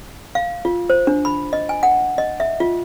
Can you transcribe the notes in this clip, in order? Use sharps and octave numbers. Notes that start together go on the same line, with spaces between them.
F5
F4
C5
D4
B5
D#5
G#5
F#5
D#5
E5
F4